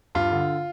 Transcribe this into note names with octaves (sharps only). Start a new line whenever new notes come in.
G2 F4
D3